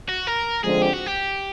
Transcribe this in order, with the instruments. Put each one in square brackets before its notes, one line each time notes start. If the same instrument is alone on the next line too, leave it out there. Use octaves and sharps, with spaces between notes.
[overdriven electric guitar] F#4
A#4
[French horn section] D3 F3 G#3 C4 [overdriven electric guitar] G#4
[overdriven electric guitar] G4
F#4
G4